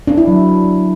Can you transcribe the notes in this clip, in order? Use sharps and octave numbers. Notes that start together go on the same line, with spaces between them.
D4
E4
F#3